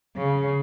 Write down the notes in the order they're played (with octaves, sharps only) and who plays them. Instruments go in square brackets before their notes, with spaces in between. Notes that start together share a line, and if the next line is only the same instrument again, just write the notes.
[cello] C#3